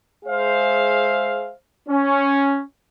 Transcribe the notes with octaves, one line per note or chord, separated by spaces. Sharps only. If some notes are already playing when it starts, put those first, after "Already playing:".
G#3 G#4 C5 E5 F5
C#4